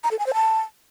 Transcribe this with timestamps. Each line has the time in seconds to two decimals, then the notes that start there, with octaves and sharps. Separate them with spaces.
0.04 A#5
0.11 A4
0.19 G#5
0.27 C5
0.34 A5